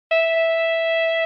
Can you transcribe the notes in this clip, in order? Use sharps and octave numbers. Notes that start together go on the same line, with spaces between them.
E5